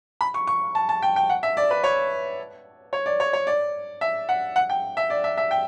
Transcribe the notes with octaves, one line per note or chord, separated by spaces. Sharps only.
B5
C#6
C#6
A5
A5
G5
G5
F#5
E5
D5
B4
C#5
C#5
D5
C#5
C#5
D5
E5
F#5
F#5
G5
E5
D5
E5
E5
G5